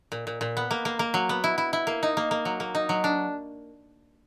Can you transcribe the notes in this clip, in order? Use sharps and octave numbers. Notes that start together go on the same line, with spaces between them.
A#2
A#2
A#2
B3
A#3
A#3
A#3
F#3
B3
E4
E4
E4
A#3
D#4
A#3
A#3
F#3
A#3
D#4
F#3
D4